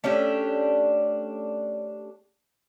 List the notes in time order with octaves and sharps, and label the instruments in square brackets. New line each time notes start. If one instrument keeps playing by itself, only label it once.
[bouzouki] A3 C#4 D4 G4